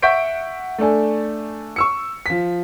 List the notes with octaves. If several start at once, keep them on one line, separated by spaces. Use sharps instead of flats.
E5 F#5 C#6 G6 B6 D7
A3 D4 A4 G#5
C#6 E6 C#7
F3 B6